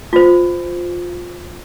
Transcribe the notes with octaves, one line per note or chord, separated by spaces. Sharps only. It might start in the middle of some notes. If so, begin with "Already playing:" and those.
F4 C5